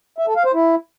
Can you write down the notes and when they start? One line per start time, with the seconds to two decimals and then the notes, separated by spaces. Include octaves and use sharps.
0.18 E5
0.27 A4
0.36 F5
0.45 C5
0.54 E4